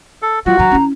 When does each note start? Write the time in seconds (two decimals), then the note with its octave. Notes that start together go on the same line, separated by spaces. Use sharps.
0.22 A4
0.46 F#3 F4 F#4
0.59 D3 F#3 A#5
0.71 C#4 E4